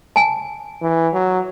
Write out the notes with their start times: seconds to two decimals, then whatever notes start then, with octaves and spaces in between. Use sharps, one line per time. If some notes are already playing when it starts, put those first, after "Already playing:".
0.16 G#5 A5
0.82 E3
1.13 F#3